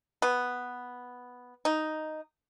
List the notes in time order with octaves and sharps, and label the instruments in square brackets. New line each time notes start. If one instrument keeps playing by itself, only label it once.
[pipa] B3
D#4